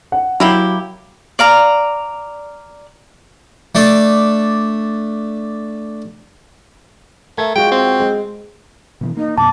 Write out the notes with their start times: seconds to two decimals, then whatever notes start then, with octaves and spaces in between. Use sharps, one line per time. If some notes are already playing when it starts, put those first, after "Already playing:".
0.12 F#5
0.40 F#3 A#3 E4 G4
1.39 D5 F5 A#5
3.75 A3 D4 D5
7.38 A3 A#4 E5 G#6
7.56 G#3 F4 F#4 G5
7.72 C4
8.00 G#3
9.01 B2 D#3 E3
9.17 A#3 D#4
9.38 F#2 B2 A5 D6